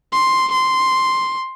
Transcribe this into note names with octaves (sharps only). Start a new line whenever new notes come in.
C6
C6